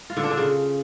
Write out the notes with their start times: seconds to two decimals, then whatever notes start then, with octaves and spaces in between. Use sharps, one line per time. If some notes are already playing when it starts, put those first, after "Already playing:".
0.10 F4
0.17 D3
0.24 D4
0.30 D3
0.37 C#3